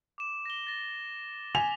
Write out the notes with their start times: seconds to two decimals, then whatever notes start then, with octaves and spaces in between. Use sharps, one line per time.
0.18 D6 E7
0.46 A#6 G7
0.67 A6 A#6
1.55 G#5 B6 F7